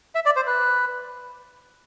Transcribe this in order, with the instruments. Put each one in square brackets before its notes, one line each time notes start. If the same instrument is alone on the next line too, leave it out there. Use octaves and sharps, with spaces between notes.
[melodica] E5
D5
C5
B4